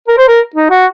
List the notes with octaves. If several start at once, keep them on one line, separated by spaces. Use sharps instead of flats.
A#4
C5
A#4
D#4
F#4